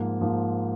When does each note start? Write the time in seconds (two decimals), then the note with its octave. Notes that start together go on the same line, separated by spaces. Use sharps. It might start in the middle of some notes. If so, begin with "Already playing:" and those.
Already playing: G#2 F3 A#3
0.21 G#2 F3 A#3